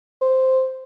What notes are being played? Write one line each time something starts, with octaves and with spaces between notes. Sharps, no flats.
C5